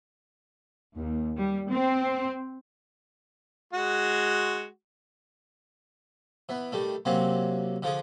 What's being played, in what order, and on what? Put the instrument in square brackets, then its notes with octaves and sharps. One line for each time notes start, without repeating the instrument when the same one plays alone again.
[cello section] D#2
G3
C4
[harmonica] G#3 F#4
[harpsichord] E3 B3
D#3 G3 A3
C3 F#3 A#3 C4 C#4
D3 F3 F4 G#4